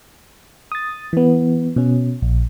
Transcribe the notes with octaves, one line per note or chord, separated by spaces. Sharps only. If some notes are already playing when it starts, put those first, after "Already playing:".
D#6 A6
E3 B3
B2 C#4
A#1